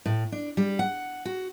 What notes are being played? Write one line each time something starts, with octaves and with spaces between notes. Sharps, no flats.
A2
D4
G3
F#5
F#4